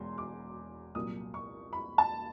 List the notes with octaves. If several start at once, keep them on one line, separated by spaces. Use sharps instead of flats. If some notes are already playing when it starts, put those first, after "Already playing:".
Already playing: E1 E2 C6
D6
C2 A#2 F#3 D#6
C#6
B5
A5